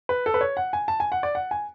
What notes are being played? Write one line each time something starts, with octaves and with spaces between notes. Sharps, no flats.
B4
A4
B4
C#5
F#5
G#5
A5
G#5
F#5
D5
F#5
G#5